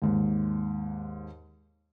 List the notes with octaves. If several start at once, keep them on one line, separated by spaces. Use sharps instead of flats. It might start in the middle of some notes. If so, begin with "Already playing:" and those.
D#2 G#2